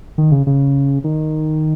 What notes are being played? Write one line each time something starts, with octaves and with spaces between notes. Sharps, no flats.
D#3
C#3
C#3
D#3